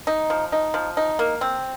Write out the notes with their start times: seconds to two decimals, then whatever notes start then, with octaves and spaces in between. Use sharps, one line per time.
0.07 D#4
0.30 F3
0.52 D#4
0.74 F3
0.97 D#4
1.19 A#3
1.41 C4